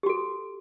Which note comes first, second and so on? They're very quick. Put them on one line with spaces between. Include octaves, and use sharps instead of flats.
G4 F#4 A4